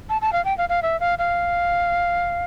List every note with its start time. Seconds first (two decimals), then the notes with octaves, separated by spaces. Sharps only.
0.10 A5
0.22 A5
0.33 F5
0.45 G5
0.58 F5
0.69 F5
0.83 E5
1.00 F5
1.19 F5